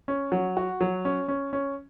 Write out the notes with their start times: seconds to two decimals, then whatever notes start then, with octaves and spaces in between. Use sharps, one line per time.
0.08 C#4
0.32 F#3
0.57 F#4
0.81 F#3
1.05 C#4
1.28 C#4
1.53 C#4